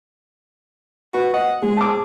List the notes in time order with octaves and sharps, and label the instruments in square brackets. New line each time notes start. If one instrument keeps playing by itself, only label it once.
[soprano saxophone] F#4 [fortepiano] B4
[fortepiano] D#5 [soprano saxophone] F#5
[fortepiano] G#3 [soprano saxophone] G#4
[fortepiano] A5 D6